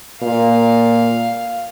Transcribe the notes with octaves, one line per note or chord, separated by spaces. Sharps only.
A#2 F5